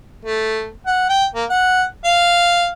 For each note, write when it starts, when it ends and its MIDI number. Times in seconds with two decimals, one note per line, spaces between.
0.25 0.67 57
0.86 1.05 78
1.09 1.25 79
1.35 1.44 58
1.50 1.84 78
2.05 2.69 77